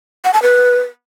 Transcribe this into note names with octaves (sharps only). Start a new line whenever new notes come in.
F#5
A5
B4